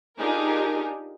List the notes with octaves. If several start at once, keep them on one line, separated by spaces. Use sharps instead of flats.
D4 D#4 F4 G4 G#4 A#4